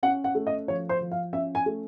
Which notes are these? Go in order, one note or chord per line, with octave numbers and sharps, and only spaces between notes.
C#4 F#5
F#5
A3
D#5
F3 C#5
C5
F3
F5
C#4 E5
G#5
A3